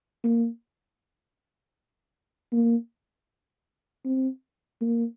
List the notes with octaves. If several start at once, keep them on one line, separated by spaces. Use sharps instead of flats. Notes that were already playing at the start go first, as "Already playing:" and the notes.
A#3
A#3
C4
A#3